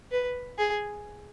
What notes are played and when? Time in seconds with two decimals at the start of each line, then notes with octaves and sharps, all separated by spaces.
0.11 B4
0.58 G#4